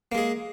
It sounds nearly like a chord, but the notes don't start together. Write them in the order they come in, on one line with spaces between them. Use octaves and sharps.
A#3 G#3 G#4